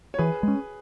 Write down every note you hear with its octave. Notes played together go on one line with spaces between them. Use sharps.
C#5
E3 G#4 B4
G#3 C#4